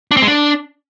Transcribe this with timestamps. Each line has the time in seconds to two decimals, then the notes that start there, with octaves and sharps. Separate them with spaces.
0.11 D4
0.17 C4
0.22 G#3
0.28 D4